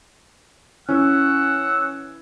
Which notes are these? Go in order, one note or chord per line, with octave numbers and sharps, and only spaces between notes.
E3 C#4 F#5 E6